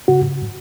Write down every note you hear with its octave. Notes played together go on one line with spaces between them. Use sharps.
C#3 F#4